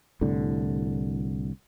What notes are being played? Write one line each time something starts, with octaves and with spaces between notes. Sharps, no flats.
C2 A2 D3